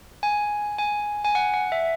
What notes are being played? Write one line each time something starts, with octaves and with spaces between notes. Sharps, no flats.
G#5
G#5
G#5
F#5
F#5
E5